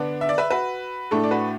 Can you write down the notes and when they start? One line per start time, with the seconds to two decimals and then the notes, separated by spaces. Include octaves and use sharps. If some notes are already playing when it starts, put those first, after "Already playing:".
Already playing: D3 B3 D4
0.21 E5
0.29 D5
0.38 B4 E5
0.50 F#4 B4
1.11 A2 A3 D4 A4
1.23 D5
1.31 F#4 B4